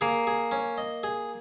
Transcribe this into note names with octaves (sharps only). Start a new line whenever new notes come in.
A#3 G#4
G#4
C#4
D#5
G#4